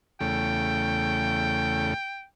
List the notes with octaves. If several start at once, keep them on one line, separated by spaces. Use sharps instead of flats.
E2 C#3 A3 G5